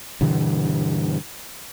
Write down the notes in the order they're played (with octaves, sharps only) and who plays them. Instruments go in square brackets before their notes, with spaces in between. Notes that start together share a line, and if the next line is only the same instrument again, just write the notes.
[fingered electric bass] G2 B2 D3 E3